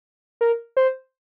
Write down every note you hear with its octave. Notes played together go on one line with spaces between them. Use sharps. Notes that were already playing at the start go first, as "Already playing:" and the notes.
A#4
C5